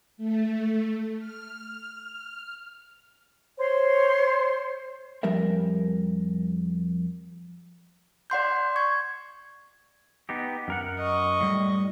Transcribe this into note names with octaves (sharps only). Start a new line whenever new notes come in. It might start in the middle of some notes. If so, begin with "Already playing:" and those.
A3
F6
C5 C#5 C6
F2 F3 G3 G4 A#4 E5
D5 F#5 C6 G6
C#6 G#6
B3 D#4 G4
F#2 A#4 F#5
D#5 C#6
A2 G3